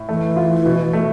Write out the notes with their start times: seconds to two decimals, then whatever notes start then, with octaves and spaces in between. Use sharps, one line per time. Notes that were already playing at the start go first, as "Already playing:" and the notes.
Already playing: A2
0.09 E3 A3
0.36 F4
0.66 B2
0.93 A3